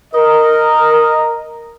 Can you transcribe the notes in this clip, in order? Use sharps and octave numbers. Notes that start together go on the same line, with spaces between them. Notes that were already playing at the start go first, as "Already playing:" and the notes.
A#4 D#5